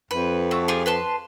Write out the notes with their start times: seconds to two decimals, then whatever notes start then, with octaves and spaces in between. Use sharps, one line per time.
0.11 F2 B4
0.51 A3 F#4 E6
0.68 F4 G4 G#4
0.86 B4 A5 C6